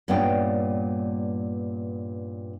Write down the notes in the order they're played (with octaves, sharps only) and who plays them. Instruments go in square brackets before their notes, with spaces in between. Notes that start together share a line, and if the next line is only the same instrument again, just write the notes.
[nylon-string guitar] G2 A#2 B3 C#4 D5 G5